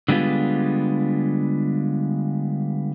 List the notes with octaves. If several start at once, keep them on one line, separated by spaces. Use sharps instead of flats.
D3 G3 G#3 B3 F4